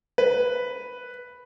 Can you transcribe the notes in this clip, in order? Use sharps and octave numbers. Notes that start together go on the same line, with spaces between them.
B4